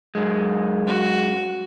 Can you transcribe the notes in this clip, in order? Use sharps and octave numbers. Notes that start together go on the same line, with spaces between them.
F#2 G#3
F#4